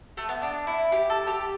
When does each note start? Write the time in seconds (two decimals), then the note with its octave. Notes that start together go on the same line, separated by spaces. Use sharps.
0.17 A3
0.29 B3
0.42 D4
0.67 E4
0.92 G4
1.10 A4
1.27 G4